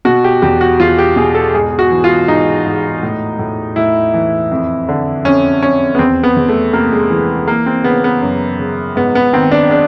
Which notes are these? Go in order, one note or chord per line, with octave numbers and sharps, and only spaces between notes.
B2 F#4
G4
E2 G4
F#4
E2 F4
G4
B2 G#4
A4
G#2 G#4
F#4
E3
F4
G#2 D#4
G#2
A2
A2
A2 E4
E3
F2
D3
F2 C#4
F2 C#4
B3
E2 C4
B3
E2
A3
C3 A#3
G#3
E3
E3 A#3
C4
C#3 B3
B3
F#2
C#3
G#2 B3
B3
D#3 C4
D4
D4